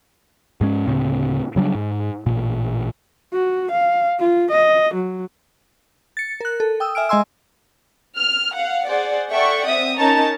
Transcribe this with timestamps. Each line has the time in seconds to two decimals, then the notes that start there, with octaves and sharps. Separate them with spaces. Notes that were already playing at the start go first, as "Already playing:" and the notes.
0.61 G#2 G#3 C#4
0.87 D2 A2 C#3 C4
1.56 C#3 F#3 G3 D4
1.75 G#2
2.26 A1 A#2
3.33 F#4
3.71 F5
4.19 F4
4.51 D#5
4.94 F#3
6.17 A6 C#7
6.40 A#4 F#6
6.60 A4
6.80 G5 D#6 E6
6.95 E5 G#5 F6 D7
7.09 G#3 D#5 G#5 C6 E6
8.16 F6
8.54 F5 F#5
8.86 G#4 C5 D5 F#5
9.29 A4 D5 E5 F#5 G5 C#6
9.65 C4 E5 D#6
9.97 C#4 D#4 A#4 C#5 A5 A#5